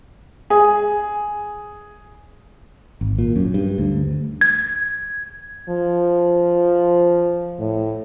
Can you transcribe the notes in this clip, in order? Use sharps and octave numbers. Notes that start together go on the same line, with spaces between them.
G#4
G#1
A#2
F#2
G2
D2
G#6
F3
A2